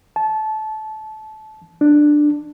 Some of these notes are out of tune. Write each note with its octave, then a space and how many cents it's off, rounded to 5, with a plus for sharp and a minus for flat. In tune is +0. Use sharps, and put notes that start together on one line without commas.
A5 -20
D4 +10